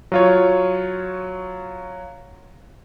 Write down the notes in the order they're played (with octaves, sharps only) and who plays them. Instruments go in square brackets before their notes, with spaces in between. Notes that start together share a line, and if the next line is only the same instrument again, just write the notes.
[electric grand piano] F#3 F4 C#5